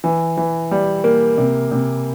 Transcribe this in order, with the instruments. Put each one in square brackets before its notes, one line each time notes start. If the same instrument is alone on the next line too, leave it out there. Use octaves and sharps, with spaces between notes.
[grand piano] E3
E3
G3
A#3
C3
C3